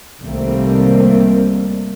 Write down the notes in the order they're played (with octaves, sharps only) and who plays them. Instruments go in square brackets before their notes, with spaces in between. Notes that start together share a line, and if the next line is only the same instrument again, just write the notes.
[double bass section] C2 D#3 G3 A3 A#3 C4